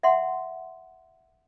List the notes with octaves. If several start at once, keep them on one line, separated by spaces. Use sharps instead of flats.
E5 F#5 C6